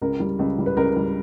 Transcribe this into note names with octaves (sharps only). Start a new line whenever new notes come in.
C#2 A#4
G3
C#2
G3
B4
C#2 A#4
G3